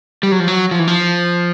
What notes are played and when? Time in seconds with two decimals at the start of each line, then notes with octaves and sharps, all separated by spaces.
0.23 G3
0.32 F#3
0.40 F3
0.48 F#3
0.71 F3
0.79 E3
0.88 F3